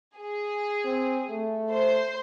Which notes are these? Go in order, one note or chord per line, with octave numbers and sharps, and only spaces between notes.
G#4
C4
A3
C5